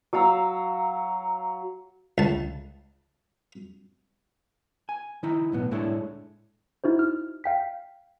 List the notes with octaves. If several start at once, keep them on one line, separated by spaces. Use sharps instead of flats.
F#3 F5 A#5 E6
C#2 A5
G#5
D#3 D#4 E4 A#5
B1 A2 B3
A2 G#3 D4 E4 A4 C#5
D#4 E4 F#4 C5
F6
F5 G5 B6